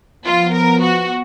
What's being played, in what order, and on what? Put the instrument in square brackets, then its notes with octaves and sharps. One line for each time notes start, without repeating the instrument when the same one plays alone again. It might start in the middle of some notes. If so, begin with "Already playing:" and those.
[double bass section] F3 B3 [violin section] F4
[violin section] A#4
F#4